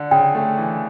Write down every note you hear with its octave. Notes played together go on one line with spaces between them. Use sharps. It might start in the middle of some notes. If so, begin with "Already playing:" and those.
Already playing: D3
C#3 G5
A3
E3